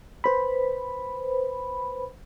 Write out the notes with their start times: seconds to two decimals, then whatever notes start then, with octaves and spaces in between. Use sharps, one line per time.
0.24 B4 C5 B5